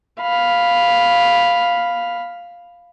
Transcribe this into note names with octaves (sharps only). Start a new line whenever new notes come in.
F5 B5